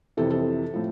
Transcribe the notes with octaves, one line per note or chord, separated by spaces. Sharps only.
F2 C3 E3 A4
A4
A2 F3